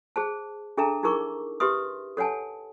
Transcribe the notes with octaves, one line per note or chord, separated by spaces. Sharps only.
G#4 C5 A5
D4 G#4 A4 E5 A5 A#5
D#4 E4 G#4 A#4 C#6 D6
G4 B4 E5 C6 D#6
A4 C#5 F#5 G#5 A5